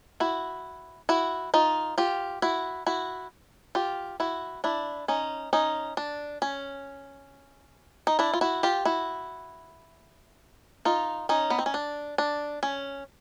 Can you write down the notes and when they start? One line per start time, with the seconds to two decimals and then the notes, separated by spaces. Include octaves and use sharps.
0.20 E4 F#4
1.09 E4 F#4
1.54 D#4 F4
1.98 F4 G4
2.42 E4 F#4
2.86 E4 F#4
3.75 F4 G4
4.20 E4 F#4
4.64 D4 E4
5.08 C#4 D#4
5.53 C#4 D#4
5.97 D4
6.42 C#4
8.07 D#4
8.19 D4 E4
8.33 F4
8.41 E4 F#4
8.63 F4 G4
8.85 E4 F#4
10.85 D#4 F4
11.29 C#4 D#4
11.50 B3
11.59 C4
11.66 C#4
11.74 D4
12.18 D4
12.63 C#4